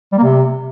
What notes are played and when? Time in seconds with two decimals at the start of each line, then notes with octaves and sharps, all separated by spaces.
0.13 G3
0.18 A#3
0.23 C3